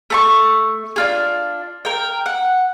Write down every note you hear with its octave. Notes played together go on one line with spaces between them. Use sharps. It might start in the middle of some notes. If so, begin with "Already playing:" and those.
A3 A5 C#6
D4 F4 G#4
A#4 G5
F#5